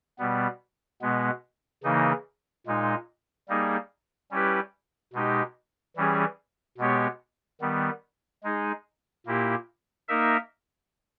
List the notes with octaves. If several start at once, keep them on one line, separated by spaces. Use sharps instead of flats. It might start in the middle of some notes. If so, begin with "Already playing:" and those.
B2 G3 B3
B2 G#3 B3
C#3 E3 A#3 D#4
A#2 G#3 D#4
G3 A#3 D#4 G#4
G3 C#4 E4 G4 B4
B2 G#3 D#4 G4
E3 G3 C#4 G#4
B2 G#3 B3 G4 C#5
D#3 G3 B3
G#3 D#4 G#4
A#2 A#3 E4 G4
A#3 D#4 A#4 E5